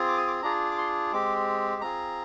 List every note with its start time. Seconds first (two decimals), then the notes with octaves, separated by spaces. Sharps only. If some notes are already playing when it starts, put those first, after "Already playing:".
Already playing: C4 F4 G#4
0.08 D6
0.18 D#6
0.27 D6
0.42 D4 F4 G#4 A#5
0.71 D6
0.78 C6
1.13 G#3 C4 G4 D6
1.82 C4 F4 G#4 A#5